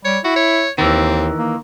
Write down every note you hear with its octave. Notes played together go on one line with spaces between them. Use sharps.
G3 C#5
E4 F#4
C#5
D#2 D#3 E3 C4
A#3